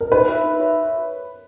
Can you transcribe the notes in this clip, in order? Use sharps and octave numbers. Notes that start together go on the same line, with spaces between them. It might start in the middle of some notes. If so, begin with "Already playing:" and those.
A#4
D#4 B4
F#4 C#5 E5
D#4
F#4 C#5 E5